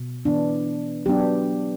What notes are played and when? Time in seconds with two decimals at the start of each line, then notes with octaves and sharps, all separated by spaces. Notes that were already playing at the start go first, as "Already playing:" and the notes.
Already playing: B2
0.25 E3 B3 D4
1.06 F#3 B3 D4 G4